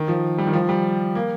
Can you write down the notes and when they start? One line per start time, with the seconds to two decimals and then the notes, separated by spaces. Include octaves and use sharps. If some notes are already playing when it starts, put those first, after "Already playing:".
Already playing: D#3
0.08 F3
0.38 G3
0.47 D#3
0.53 F3
0.69 G3
1.15 A#3